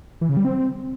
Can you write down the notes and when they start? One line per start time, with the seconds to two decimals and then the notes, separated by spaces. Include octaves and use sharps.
0.21 E3
0.29 C#3
0.37 G3
0.45 C4